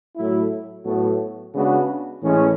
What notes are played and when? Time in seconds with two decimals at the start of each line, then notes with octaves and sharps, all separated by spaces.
0.16 A2 F#3 A3 E4
0.85 A2 F#3 B3 F#4 A4
1.54 C#3 G#3 B3 D4 F#4
2.23 A2 E3 G#3 C#4